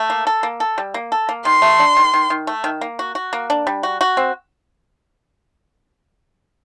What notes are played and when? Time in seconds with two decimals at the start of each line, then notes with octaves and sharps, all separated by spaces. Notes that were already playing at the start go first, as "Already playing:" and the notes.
Already playing: A3
0.10 A#3
0.27 A4
0.43 A#3
0.60 A4
0.78 G3
0.94 A#3
1.12 A4
1.29 A#3
1.45 D#3 C6
1.62 A3
1.79 D4
1.97 D#3
2.14 D#3
2.30 D#3
2.47 A3
2.64 D#3
2.81 A#3
2.99 F#4
3.15 F#4
3.33 A#3
3.50 D4
3.67 G3
3.83 F#4
4.01 F#4
4.17 C4